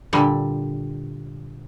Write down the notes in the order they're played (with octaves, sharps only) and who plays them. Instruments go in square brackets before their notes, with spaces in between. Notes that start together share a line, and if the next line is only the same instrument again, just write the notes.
[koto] A#2 D3 G3